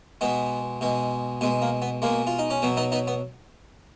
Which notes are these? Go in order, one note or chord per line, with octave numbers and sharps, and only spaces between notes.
B2 G#3 B3
B2 G#3
B2 G#3 B3
A#3
B3
B2 G#3 A#3
F4
D#4
C#4
B2 F#3 B3
B3 D#4
B3 D#4
B3